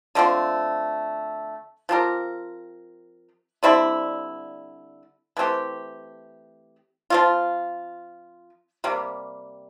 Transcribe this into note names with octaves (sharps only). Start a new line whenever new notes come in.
D3 F3 A3 C4
F3 C4 G4 A#4
D3 G3 C4 E4
E3 A3 C4 G4
F3 C4 F4
C3 G3 A#3